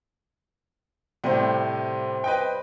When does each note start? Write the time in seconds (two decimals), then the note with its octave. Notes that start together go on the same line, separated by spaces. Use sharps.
1.24 A2 C3 G3 C5
2.24 B4 D#5 G5